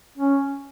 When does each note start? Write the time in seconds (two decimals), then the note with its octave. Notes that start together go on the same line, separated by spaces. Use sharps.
0.18 C#4